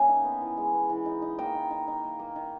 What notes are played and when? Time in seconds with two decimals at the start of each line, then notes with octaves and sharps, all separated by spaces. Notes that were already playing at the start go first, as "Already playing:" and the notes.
Already playing: D#3 A#3 C#4 E5 G#5
0.09 D#4
0.25 B3
0.41 E3
0.57 G#3
0.74 B3
0.90 E3
1.06 D#4
1.22 D#4
1.38 A#3 G5 A#5
1.55 D#3
1.71 D#4
1.88 D#4
2.04 A#3
2.19 A#3
2.36 D#3